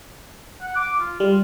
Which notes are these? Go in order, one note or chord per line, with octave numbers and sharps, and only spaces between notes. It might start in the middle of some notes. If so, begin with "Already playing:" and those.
F#5
D6
F4
G3 F4